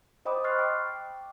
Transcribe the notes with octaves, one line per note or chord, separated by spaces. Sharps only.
C5 D#5 G5 B5 D6 D#6
C6 C#6 F6 F#6 A6 C7
G5 D6